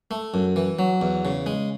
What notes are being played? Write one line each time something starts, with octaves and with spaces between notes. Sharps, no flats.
A3
F#2
E3
F#3
E2
C#3
G#3